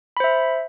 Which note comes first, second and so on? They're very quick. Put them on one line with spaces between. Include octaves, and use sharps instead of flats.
B5 C5 E5